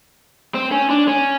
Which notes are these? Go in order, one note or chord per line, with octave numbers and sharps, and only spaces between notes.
C4
C#4
D4
C#4